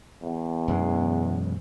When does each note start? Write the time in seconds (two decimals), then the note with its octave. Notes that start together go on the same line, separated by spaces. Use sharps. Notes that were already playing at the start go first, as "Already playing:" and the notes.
0.23 E2
0.68 E1 F#2 G#3